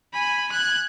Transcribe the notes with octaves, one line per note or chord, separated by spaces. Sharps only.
G#5 B5
F#6 G#6